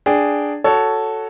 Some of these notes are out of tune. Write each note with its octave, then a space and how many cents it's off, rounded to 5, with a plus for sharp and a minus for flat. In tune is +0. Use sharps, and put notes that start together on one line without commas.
D4 +0 G#4 -5 G5 -15
F#4 +0 A4 +0 C#5 +10